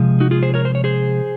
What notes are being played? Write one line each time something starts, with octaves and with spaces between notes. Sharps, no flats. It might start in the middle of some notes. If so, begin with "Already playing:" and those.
Already playing: C3 F3 G#3
D#4 F#4
F4 G#4
G#4 C5
A#4 C#5
C5
C#5
G#4 C5